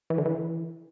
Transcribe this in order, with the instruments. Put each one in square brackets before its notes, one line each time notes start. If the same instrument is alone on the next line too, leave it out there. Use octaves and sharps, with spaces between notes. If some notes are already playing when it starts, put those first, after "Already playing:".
[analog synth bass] E3
D3
E3